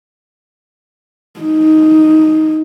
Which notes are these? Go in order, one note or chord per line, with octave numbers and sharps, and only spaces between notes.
D#4